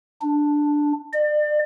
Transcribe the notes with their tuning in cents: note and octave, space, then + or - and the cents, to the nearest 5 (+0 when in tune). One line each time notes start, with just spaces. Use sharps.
D4 +5
D5 +35